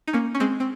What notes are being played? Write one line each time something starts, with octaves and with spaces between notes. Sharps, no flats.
D#4
A#3 C#4
C#4
G#3 C4
C4